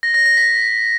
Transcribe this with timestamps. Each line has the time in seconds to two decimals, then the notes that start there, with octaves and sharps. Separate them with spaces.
0.03 A#6
0.14 A#6
0.26 A#6
0.37 B6